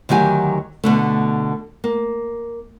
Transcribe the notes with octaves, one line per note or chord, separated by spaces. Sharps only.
D2 D#3 F#3 G4 G#5
B2 D3 A3
A#3